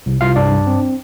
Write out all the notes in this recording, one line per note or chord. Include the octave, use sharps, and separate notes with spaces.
C2
C2 F4 F5
G2 D4 D5
G2
C4